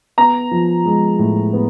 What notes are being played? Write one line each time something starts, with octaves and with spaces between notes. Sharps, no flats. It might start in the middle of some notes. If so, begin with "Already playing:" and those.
B3 A#5
F3
G#3
A2
B3